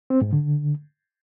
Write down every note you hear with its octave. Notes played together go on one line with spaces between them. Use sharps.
C4
G#2
D3